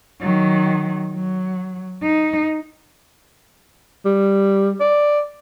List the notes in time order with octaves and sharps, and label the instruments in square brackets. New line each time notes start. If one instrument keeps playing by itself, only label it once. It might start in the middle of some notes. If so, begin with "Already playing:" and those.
[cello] D#3 F#3
F#3
D#4
[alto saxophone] G3
D5